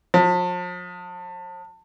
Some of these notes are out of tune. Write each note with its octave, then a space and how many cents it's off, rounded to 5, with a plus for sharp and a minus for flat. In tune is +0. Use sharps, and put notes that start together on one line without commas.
F3 +40